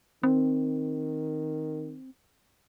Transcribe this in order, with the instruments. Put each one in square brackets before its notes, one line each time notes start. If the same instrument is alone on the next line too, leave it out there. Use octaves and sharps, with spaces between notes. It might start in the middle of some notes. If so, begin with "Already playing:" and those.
[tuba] D#3 [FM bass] C4